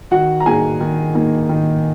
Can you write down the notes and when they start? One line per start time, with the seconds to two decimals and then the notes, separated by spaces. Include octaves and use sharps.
0.11 D#3 F#4 F#5
0.40 A#5
0.46 A#3 D#4 G#4 G#5
0.80 D#3
1.14 A#3 D#4
1.49 D#3